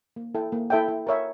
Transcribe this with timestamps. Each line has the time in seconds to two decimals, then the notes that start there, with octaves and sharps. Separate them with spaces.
0.16 A#3
0.35 E4 A4 E5 G5
0.52 A#3
0.70 E4 A4 E5 G5
0.88 E4
1.07 A#4 C#5 E5